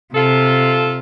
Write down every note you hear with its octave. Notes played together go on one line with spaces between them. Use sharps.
C3 F4 A4